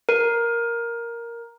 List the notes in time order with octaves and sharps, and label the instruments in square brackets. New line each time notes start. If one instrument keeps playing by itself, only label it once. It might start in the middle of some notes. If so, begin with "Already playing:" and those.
[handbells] A#4